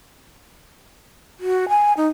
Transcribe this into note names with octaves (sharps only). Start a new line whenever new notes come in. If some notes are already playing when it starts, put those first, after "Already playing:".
F#4
G#5
D#4